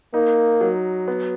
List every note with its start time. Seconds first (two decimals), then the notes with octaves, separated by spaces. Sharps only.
0.14 A#3 D#4
0.61 F#3
1.08 B3